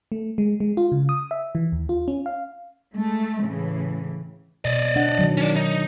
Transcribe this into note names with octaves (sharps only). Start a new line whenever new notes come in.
A3
G#3
G#3
F4
C#3
D#6
E5
E3
D#2
F4
C#4
F5
G#3 A3
A2 C#3 E3
B2 D5 D#5
D4 F#5
D#3 F#3
C#4 D5
D#4